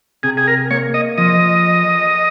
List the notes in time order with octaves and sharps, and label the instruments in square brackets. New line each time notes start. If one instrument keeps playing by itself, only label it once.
[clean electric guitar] C3 [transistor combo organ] G#4
[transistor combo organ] G#4
A#4
[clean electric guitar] A#3 [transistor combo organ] C#5
[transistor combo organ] D#5
[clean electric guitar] F3 [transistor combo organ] D#5